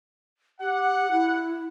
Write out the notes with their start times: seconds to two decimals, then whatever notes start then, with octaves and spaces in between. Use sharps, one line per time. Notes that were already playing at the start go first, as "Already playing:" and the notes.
0.61 G4 F#5
1.11 E4